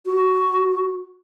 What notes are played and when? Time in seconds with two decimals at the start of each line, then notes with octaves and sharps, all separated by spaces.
0.06 F#4